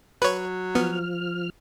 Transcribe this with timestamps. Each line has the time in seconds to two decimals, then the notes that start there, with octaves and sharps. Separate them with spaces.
0.22 F#3 B4 C#5
0.75 F3 B3 F6